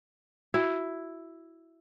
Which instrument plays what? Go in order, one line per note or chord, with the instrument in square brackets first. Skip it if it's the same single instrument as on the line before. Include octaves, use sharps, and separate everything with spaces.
[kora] E4 [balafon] F#4